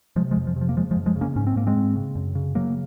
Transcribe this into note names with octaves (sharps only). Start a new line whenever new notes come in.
C3 F3 G#3
F3 G#3
F2
F3
C3
F3
A#3
C#3 F3 G#3
F3 G#3
F#2
F3 G#3
C#3
A#3 C#4
G#2 C#4
C4
G#2 A#3
G#3 C4
G#2
C#3
F#2
C#3
C#3 F#3 A#3